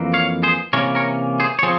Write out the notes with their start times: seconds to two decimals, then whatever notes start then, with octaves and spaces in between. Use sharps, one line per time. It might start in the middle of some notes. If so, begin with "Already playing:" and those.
Already playing: F2 E3 A#3
0.13 C#5 F5
0.43 G#4 C5
0.73 C3 E3 A#3 C#4 A#4 C#5
0.95 A#4 C#5
1.40 G#4 C5
1.59 C#5
1.63 F3 C4 G#4 C5